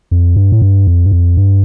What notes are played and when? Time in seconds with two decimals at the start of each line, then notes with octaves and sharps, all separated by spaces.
0.11 F2
0.36 G2
0.52 A2
0.62 G2
0.87 F2
1.06 G2
1.12 F2
1.37 G2